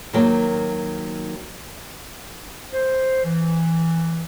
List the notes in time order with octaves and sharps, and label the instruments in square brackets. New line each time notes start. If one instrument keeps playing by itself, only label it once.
[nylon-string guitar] D#3 F#3 A#3
[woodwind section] C5
E3